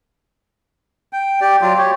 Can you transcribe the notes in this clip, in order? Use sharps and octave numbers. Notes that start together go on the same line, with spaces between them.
G5
G4 D5
F#3 F4 D5
G4 C#5